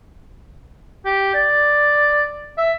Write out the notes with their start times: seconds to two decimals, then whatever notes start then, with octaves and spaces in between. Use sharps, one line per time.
1.06 G4
1.34 D5
2.58 E5